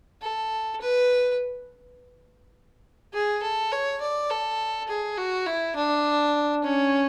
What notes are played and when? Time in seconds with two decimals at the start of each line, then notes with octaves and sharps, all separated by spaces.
0.22 A4
0.81 B4
3.14 G#4
3.42 A4
3.72 C#5
4.01 D5
4.30 A4
4.89 G#4
5.18 F#4
5.46 E4
5.76 D4
6.64 C#4